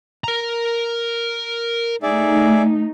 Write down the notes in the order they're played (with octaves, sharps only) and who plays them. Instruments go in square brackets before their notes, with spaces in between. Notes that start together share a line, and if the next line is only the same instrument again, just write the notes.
[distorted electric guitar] A#4 A#5
[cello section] A3 D#4 [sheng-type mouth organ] G#4 D5 E5